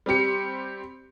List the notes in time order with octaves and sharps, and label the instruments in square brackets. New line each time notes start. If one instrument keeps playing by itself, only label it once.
[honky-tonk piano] G3 C4 G4 C#7